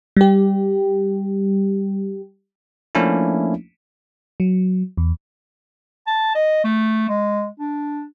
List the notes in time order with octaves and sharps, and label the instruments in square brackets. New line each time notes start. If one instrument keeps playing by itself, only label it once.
[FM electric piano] G3 G4
[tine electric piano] F3 A3 A#3 C#4 D4 E4
[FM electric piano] F#3
E2
[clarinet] A5
D#5
A3
G#3
D4